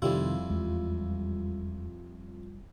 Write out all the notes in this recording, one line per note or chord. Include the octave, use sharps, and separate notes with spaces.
F2 C3 D#3 G3 E4 F4
E2 G#3